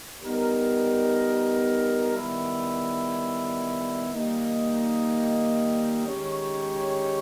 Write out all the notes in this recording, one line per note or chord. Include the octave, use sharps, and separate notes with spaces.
G3 B3 D#4 A#4
D#3 G3 B3 E4
D#3 G3 A#3 D#4
D#3 G#3 C#4 G4 C#5